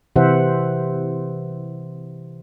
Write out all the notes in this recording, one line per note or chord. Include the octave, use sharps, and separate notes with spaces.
C3 E3 C5 E5 F#5